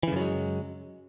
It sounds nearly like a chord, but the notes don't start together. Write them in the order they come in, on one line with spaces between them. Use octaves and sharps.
E3 C#3 F#2 F#3 G#3